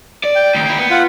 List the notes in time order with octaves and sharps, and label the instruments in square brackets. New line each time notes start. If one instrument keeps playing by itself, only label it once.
[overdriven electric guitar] D5
[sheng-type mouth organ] G5
[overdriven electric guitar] A2 D#3
A#3 E4
B3
[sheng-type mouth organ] F4 F#5